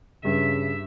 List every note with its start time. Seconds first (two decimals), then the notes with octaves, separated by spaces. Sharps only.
0.25 G2 C#3 E5